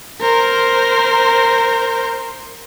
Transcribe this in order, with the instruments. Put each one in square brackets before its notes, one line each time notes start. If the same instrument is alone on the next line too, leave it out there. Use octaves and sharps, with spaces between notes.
[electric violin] A#4 C5